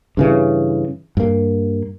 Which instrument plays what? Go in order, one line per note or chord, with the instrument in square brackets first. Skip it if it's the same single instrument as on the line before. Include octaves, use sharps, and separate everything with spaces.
[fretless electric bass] G2 C#3 E3
G2 A#3